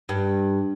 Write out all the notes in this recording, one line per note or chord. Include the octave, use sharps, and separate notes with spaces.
G2